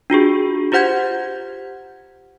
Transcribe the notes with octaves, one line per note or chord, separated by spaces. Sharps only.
D4 F4 F#4 G#4
F4 G4 C5 F#5 G6 G#6